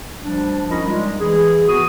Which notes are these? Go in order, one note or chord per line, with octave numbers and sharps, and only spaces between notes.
D2 F3 G3 D4
C#4 D#4 F4 A#4 D#5 B5
G3 G#3
E3 G#4
B3 F#4 D#6